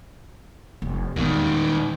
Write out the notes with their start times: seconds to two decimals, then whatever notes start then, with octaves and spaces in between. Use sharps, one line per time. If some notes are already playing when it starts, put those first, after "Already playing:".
0.82 F1 D#4
1.16 E2 A#2 D#3 G#3